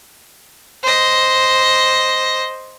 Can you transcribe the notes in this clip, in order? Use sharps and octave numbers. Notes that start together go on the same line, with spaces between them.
C5 D#5